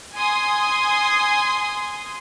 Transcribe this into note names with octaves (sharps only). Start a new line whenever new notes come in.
G#5 C6 D#6